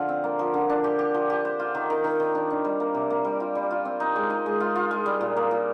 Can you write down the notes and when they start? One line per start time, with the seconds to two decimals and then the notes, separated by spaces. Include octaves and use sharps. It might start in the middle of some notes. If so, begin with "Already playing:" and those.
Already playing: D3 F3 F4
0.09 C4
0.24 A#3
0.39 F3
0.54 D3
0.69 D4
0.84 G4
0.99 G4
1.14 F3
1.30 G4
1.45 C5
1.60 F4
1.75 D#3
1.90 D#3
2.04 D#3
2.20 D#3
2.35 D4
2.50 D4
2.64 G3
2.80 A#3
2.94 C3
3.10 A#3
3.25 G3
3.40 F4
3.55 G3
3.71 F4
3.85 C4
4.00 D#4
4.16 G#3
4.30 D#4
4.46 G#3
4.60 F4
4.76 F4
4.91 G#3
5.06 G3
5.21 A#2
5.36 A#3
5.51 A#2